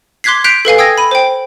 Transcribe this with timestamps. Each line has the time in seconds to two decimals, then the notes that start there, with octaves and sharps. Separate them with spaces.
0.24 C6 D6 F#6 G#6 B6 C7
0.44 F#6 G6 B6 C7 D7 F7
0.65 A4 B4 F5 G#5
0.78 G5 D#6 E6 G#6 A#6
0.98 B5 D#7
1.11 C5 G5